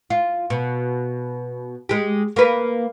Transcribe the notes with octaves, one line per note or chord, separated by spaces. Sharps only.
F4
B2
G#3 G4
A#3 B4